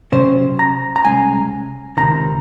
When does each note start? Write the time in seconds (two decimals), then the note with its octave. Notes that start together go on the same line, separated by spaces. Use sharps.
0.12 C3 F#3 C#4 C5
0.59 A#5
0.96 A#5
1.05 C2 A#2 G#3 C#4 G#5
1.97 C#2 C3 D#3 A#5